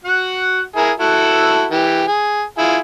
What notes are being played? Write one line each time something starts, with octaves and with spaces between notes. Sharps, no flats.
F#4 F#5
E4 G#4 A#4
E4 F#4 A4
E3 G4
G#4
E4 F4 G#4